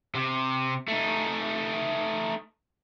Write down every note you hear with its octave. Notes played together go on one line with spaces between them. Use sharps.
C3
A3 D#4